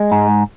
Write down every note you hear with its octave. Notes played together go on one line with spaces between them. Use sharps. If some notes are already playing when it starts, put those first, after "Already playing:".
Already playing: G#3
G#2